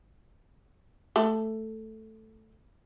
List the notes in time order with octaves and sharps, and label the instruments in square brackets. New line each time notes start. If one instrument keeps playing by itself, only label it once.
[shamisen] A3 A4